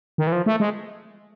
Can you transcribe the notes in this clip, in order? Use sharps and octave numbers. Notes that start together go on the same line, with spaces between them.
D#3
E3
F3
A3
G#3